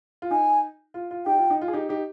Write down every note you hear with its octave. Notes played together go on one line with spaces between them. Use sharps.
F4
D#4 G#5
F4
F4
D#4 G4 G5
F4
D#4
F4
G#4
D#4 G4
D#4 G4